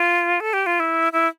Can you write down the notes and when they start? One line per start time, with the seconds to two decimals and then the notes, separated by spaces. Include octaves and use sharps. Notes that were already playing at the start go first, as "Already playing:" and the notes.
Already playing: F4
0.40 A4
0.53 G4
0.66 F4
0.80 E4
1.12 E4